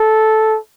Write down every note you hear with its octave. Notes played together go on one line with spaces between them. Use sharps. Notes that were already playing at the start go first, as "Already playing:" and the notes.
Already playing: A4